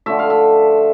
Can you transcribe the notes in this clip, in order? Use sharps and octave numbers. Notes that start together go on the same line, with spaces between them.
D3 F3 A3 E5
F5
E5